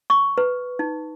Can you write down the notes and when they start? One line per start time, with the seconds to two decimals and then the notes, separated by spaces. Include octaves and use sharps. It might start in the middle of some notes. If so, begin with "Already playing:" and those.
0.10 C#6
0.38 B4
0.79 D#4